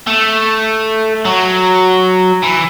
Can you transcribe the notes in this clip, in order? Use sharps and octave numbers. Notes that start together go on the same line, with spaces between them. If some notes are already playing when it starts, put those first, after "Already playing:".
A3
F#3
E3